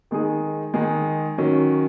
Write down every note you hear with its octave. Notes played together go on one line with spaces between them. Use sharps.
D#3 G#3 D#4 G#4
D#3 G#3 D#4 G#4
D#3 F#3 C#4